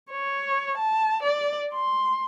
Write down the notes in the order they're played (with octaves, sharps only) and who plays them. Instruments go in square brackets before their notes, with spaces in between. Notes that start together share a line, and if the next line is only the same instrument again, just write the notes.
[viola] C#5
A5
D5
C6